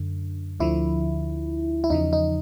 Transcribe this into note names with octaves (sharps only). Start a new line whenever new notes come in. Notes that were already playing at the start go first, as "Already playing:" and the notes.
Already playing: F#2 D3
D2 D3 F3 E4
E4
E2 C#3 F3 D#4
D#4